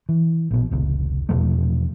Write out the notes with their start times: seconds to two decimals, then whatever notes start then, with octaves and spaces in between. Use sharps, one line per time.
0.09 E3
0.51 A#1 B2
0.71 F1 C#2
1.29 E2 B2 F3 A3